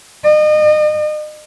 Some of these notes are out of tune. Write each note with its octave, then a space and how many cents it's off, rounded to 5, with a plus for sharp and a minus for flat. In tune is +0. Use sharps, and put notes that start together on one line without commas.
D#5 -35